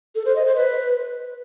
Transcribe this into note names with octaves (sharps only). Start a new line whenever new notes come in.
A4
C5
D#5
C5
B4